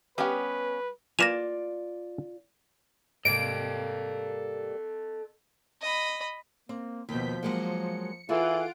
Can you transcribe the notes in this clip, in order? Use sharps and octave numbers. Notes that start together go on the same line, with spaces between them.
G3 B3 C#4 G4 B4 F5
A#3 F4 B4 D5 G#5 A#6 E7 F7
G#2 C3 G3 A#3 A4 D#5 D7
D#5 B5
A#3 C4
D#2 B2 F3 G6 B6
F#3 G#3 A#3 C#7
E3 F4 G#4 A4 F#5 D7